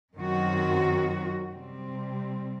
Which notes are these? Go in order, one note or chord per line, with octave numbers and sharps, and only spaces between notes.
F#2 D#3 F#3 C4 F#4
C3 G3 C4